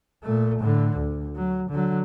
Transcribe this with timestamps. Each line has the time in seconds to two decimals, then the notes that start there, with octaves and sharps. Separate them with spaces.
0.24 A#2 A3
0.59 A2 D3
0.97 D2
1.36 F#3
1.70 D3 F#3